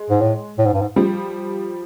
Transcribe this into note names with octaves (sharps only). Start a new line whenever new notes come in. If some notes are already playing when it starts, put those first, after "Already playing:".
Already playing: G#3
G#2
A2
A2
G#2
G2
G#2
F3 G3